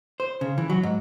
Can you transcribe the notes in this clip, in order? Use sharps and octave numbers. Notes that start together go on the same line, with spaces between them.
C5
C#3
E3
F#3
G#2